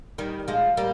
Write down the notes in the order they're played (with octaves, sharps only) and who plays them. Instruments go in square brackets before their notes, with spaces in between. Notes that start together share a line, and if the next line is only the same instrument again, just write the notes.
[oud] D#3 G3
F3 G#3
G3 A#3